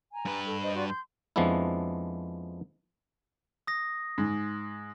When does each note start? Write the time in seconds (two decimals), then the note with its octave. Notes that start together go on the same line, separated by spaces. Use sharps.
0.13 G#5 A#5
0.25 G2 B4
0.46 A4
0.63 C5 D#5
0.75 F#4 D5 C6
0.88 C6 G6
1.36 F2 F3 G#3 B3 D4 E4
3.67 D#6 A#6
4.18 G#2